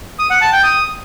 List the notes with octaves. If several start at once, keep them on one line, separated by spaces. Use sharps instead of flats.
D#6
F#5
A5
G5
D#6